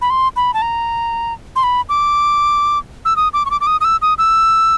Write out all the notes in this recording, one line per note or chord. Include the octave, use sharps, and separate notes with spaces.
B5
C6
B5
A5
A#5
C6
B5
D6
E6
D#6
D6
C#6
D6
D6
D#6
D#6
E6
D#6
E6